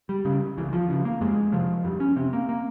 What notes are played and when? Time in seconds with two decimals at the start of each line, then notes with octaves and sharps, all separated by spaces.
0.09 G3
0.25 C#3 G3
0.57 C#2 E3
0.73 F3
0.89 C#3 F3
1.05 A#3
1.21 F2 G#3
1.52 C3 F3
1.84 F2 G3
2.00 C#4
2.16 C3 C4
2.33 A#3
2.49 A#3